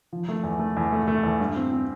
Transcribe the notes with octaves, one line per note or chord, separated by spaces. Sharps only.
F3
A3
E2
A3
E2
A3
A3
E2
G2
C4
C4